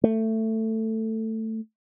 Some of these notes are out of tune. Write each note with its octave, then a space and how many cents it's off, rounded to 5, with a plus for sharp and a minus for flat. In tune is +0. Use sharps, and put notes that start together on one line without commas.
A3 +15